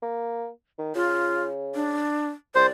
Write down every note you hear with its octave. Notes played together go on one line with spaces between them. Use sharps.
A#3
D#3
C#3 F4
D4
C2 C5 D5